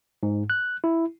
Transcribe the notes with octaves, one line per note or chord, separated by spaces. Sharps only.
G#2
F#6
E4